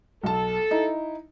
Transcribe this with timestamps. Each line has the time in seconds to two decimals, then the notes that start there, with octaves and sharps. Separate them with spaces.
0.24 B1 A4 A5
0.71 D#4 E4